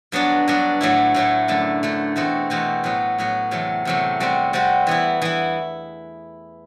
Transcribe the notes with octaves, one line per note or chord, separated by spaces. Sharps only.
G2 F#3 B3 D4 F#4
G2 F#3 B3 D4 F#4
A2 F#3 A3 E4
A2 F#3 A3 E4
F#2 D3 A3
F#2 D3 A3
E2 B2 A3 C4 F#4
E2 B2 A3 C4 F#4
A2 F#3 B3 F#4
A2 F#3 B3 F#4
E2 C3 F#3 A3
E2 C3 F#3 A3
C3 G3 C4 F#4
C3 G3 C4 F#4
E3 B3 E4
E3 B3 E4